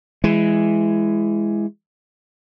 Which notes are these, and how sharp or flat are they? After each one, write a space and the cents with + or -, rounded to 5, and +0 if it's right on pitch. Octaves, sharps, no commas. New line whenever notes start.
E3 +10 G#3 +0